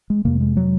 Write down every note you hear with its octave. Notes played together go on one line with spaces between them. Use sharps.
G#3
F2 C3 A#3
G#3
F#3